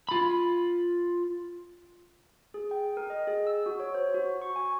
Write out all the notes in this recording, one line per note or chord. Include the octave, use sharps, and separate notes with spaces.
F4 B5
G#4
G5
A#4
D#5
G#4
E6
F#4
C#5
C5
F#4
C#6
G#5